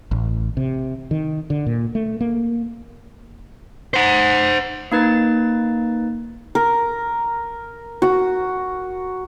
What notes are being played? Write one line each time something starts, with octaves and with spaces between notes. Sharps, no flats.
A1
C3
D#3
D3
A#2
A3
A#3
C5 F#5
A#3 D#4 B4 A6
A#4
F#4